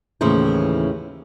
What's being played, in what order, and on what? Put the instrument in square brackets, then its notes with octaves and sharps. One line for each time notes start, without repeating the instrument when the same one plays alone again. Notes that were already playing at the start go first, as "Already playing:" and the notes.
[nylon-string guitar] D#2 A2 C#3 E3 C5